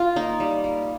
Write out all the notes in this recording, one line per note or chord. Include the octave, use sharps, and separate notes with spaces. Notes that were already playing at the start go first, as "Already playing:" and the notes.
Already playing: F4
A#3 D#4
G3
A#3